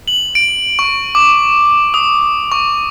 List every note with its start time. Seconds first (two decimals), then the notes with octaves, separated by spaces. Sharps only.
0.08 F#7
0.35 D7
0.79 C#6
1.15 D6
1.94 D#6
2.52 C#6